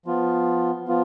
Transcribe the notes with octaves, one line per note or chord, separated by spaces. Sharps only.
F3 B3 F4
F3 B3 F4